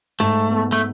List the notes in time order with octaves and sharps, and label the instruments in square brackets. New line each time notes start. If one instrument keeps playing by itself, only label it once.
[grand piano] G#2 [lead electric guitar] A3
[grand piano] B3
[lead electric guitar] A3